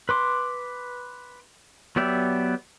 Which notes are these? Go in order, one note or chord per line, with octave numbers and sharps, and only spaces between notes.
B4 C6 D6
F#3 B3 G4 D5 E5